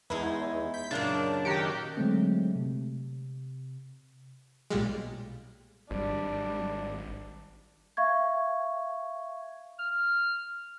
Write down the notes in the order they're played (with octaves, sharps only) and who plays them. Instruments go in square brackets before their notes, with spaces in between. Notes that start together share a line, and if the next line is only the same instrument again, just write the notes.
[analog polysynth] E2 [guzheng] G#3 D#4 E4
[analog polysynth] G6 B6
[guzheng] F#2 A#2 C#3 [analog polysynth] D4
[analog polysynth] D#3 F#4 G4
[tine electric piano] D3 F#3 G#3 A3 C4
C3
[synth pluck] B1 A#2 G3 G#3
[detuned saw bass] G#1 [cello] G3 [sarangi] D4
[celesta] E5 F5 C#6 G#6
[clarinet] F6